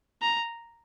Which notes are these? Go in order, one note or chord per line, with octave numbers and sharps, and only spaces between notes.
A#5